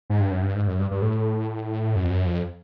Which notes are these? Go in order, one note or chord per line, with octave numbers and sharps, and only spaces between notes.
G#2
G2
F#2
G2
G#2
F#2
G2
G2
A2
F#2
F2
F#2
F2